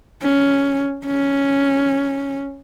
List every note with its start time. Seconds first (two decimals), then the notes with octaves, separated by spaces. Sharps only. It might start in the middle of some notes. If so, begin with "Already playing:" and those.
0.23 C#4
1.06 C#4